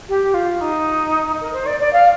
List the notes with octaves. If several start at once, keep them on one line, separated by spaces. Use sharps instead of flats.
G4
F4
D#4
A#4
C5
D5
D5
F5